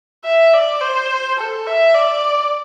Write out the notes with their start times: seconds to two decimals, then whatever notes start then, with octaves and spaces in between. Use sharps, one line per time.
0.24 E5
0.53 D5
0.81 C5
1.38 A4
1.67 E5
1.95 D5